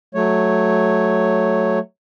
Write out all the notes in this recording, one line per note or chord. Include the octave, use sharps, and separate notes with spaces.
F#3 A3 C#5